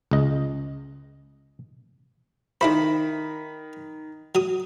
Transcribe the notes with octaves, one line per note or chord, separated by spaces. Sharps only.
C#2 D#5
D#3 D4 E4 C5 B5
F#3 D#6